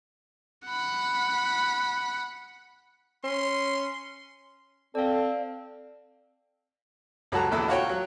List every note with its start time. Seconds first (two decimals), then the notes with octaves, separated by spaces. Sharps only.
0.66 F#5 B5
3.24 C#4 C6
4.95 C4 A4 D5 F5
7.32 C#2 F#3 F#4 A4 A5 A#5
7.51 A#1 E2 E4 A4 E6
7.68 F4 F#4 C#5 G5
7.89 F#3